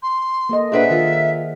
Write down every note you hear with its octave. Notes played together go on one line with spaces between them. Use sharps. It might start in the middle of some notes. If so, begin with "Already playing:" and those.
C6
A#3 A4 D#5
A#2 D4 G#4 B4 C5 E5 F#5
D#3 F4 A#4